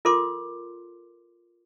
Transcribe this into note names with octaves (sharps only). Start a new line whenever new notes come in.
F4 A4 A#4 C6 D6